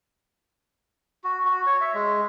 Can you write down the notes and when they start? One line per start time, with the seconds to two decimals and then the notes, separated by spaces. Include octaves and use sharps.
1.24 F#4
1.45 F#4
1.66 C#5
1.81 E5
1.94 G#3